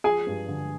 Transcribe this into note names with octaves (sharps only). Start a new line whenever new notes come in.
F3 G#4 G#5
G2
D3